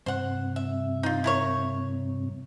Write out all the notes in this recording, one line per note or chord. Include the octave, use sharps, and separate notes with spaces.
G2 C3 C5 F#5
E5
D#4 F4
E4 A#4 C#5